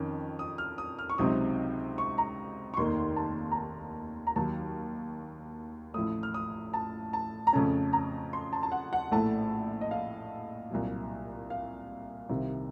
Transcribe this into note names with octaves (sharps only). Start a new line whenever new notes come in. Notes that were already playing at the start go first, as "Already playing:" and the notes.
Already playing: F2 D#3 C#4
D#6
F6
D#6
F6
C#6
C#2 C3 F#3 C4 D#4 D#6
C#6
A#5
C#6
F1 D#2 D#3 A#3 D#4 C6
A5
A#5
A5
A#5
D#2 D#3 F#3 A5
A1 A2 F3 A3 D#6
F6
D#6
A5
A5
A#5
F2 C#3 A3 C#4 A5
A#5
C6
A5
A5
F#5
F#5
A#1 A2 A3 A5
D#5
F5
C2 A#2 F#3
F5
C2 C3 D#3